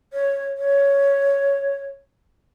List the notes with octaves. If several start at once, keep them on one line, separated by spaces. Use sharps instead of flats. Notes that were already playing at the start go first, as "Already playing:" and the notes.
C#5
C#5